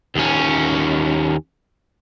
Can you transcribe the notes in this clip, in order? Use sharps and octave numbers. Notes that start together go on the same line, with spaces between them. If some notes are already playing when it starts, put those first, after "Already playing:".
D#2 C#4